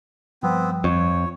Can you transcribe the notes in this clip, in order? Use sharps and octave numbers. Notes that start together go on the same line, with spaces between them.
G2 F3 G3 B3 C4
F2 C#5